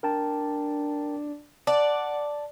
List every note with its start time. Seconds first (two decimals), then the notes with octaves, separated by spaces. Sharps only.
0.03 D4 A#4 G5 A5
1.67 D5 F#5 A5